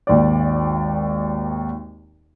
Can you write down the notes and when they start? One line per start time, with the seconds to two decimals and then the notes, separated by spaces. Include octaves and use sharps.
0.07 G#1 D#2 D5